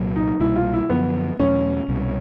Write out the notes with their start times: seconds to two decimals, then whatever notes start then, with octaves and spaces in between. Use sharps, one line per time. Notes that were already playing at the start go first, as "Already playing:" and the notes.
Already playing: C2 A#2 F#3
0.16 D#4
0.40 C2 B2 G3 A#3 E4
0.56 F4
0.74 E4
0.90 F#2 D3 F3 B3
1.39 E2 B2 F#3 A3 C#4
1.88 C2 B2 G3